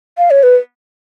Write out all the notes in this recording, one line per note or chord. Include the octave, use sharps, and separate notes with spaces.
F5
C#5
B4